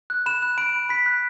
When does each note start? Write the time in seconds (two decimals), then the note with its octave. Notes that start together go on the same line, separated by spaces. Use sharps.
0.10 F#6
0.26 B5 E7
0.42 F#6
0.58 B5 D7
0.74 F#6
0.89 B5 B6
1.06 F#6